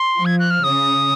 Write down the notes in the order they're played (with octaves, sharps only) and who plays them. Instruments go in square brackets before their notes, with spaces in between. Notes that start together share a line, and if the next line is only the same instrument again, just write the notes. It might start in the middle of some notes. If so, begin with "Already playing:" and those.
Already playing: [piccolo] C6
[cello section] F3
[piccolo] G#6
F#6
F6
[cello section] C#3 [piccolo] D#6